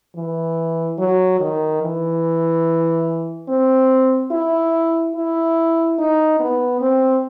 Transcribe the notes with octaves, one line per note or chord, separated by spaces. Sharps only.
E3
F#3
D#3
E3
C4
E4
E4
D#4
B3
C4